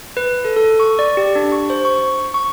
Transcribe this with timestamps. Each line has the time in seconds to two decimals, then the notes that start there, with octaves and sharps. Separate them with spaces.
0.17 B4
0.45 A4
0.56 A4
0.80 C#6
0.99 D5
1.17 G4
1.36 D4
1.52 C#6
1.70 C5
1.85 C#6
2.34 C#6